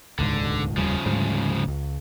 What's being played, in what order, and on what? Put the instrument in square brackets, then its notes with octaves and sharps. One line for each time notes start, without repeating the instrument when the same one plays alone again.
[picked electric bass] D#1 C#2 G#2 [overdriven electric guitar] D3
[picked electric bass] F1 D#2 G3 [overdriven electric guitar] C#3 F3
[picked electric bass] D2 G#2 G3
C#2